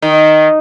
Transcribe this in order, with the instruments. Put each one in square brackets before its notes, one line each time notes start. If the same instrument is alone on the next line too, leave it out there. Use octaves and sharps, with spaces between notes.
[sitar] D#3